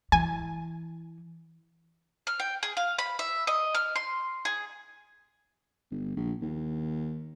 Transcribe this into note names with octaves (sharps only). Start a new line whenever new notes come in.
E3 G#5
F6
G5
G#4
F5
B5
E5
D#5
F6
C6
G#4
G1
A#1
D#2